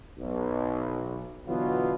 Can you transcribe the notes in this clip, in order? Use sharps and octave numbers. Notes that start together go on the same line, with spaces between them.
B1
B2 D3 E3 F#3 B3 F4